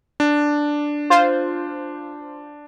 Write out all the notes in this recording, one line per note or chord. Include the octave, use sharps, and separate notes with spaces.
D4
F4 C5